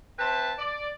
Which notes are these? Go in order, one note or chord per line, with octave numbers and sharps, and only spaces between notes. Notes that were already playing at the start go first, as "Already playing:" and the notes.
C4 B4 C5 E5 A5
D5